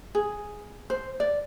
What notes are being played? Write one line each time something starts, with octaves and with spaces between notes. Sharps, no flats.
G#4
C5
D5